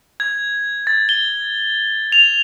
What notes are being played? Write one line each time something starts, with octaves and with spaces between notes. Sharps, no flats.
G#6
A6
G7
F7